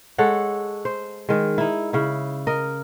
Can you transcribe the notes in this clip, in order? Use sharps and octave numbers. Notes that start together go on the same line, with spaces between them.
G#3 A4 C#5 F#5
C5
D#3 G#3
D#4 E4
C#3 E4
A#4 D#5